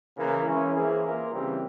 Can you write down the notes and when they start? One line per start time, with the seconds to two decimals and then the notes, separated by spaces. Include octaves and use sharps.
0.16 C#3 E3 A#3
0.45 E3 G#3 C#4 E4
0.73 E3 A#3 E4 G#4 C5
1.02 A#3 F4 A#4
1.31 C#3 E3 G3 C4